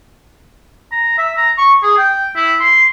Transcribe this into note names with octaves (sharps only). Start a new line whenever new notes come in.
A#5
E5
A#5
C#6
G#4
G5
E4
C6